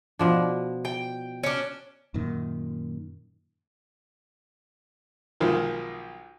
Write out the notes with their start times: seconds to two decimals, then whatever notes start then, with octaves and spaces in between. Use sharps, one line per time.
0.19 B2 F3 D4
0.85 G5
1.44 C#4 D4
2.14 F#2 A#2 D#3
5.40 B1 D#3 F3 G#3